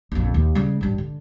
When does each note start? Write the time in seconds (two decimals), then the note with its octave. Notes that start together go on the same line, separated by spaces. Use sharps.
0.12 A#1 F2
0.34 D#2
0.55 C#3 G3
0.81 A1 G2
0.98 D3